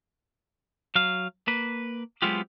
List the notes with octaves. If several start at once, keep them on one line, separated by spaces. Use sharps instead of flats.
F#3 F5
A#3 B4
F#3 G#3 B3 C4 F4 G4